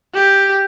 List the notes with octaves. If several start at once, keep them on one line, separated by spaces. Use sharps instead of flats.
G4